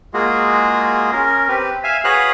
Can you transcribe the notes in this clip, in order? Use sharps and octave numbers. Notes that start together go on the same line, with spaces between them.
G#3 A#3 F4 F#4 G#4
C#4 A#4
C4 G4 B4
E5 F5 G#5
F#4 G#4 B4 C#5 F5 F#6